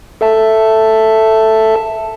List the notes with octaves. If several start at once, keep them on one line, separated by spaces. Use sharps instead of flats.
A4 E5 A5